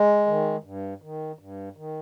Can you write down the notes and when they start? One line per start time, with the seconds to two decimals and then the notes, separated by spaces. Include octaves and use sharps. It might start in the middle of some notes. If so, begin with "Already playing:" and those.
Already playing: G#3
0.27 D#3
0.64 G2
1.02 D#3
1.39 G2
1.77 D#3